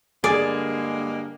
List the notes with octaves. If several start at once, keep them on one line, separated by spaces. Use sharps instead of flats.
G2 D3 G#3 A#3 G#4 D5